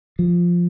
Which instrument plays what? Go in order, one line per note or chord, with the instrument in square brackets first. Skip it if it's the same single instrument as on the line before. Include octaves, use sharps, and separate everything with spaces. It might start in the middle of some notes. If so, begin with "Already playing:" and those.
[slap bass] F3